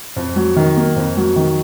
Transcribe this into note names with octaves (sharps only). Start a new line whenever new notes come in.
F2
F#3
D#3
A#3
F2
F#3
D#3